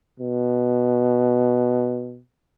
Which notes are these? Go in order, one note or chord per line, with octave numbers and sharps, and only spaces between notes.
B2